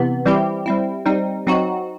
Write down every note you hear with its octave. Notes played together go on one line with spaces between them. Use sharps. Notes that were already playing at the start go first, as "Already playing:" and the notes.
Already playing: C3 E3 B3
E3 G3 C4 E4 G4
G3 C4 E4
G3 C4 D#4
F#3 C4 D#4 F#4